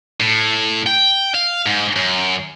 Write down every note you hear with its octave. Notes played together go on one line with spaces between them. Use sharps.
A2
G5
F5
G#2
F#2